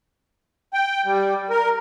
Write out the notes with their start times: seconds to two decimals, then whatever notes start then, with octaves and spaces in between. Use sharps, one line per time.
0.73 G5
1.05 G3
1.50 A#4